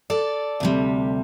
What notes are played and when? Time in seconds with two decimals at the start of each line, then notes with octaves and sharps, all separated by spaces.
0.10 A4 D5
0.60 D2 C3 G3